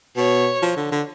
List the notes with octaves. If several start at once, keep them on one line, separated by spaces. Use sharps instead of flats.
B2 C#5
F3
D3
D3